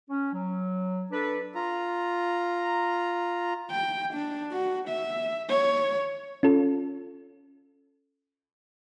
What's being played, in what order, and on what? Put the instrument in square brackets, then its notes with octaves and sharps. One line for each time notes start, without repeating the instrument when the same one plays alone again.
[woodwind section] C#4
F#3
D4 A4 B4
[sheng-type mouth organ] F4 A#5
[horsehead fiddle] G5
D4
F#4
E5
C#5
[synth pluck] C#4 F4 A4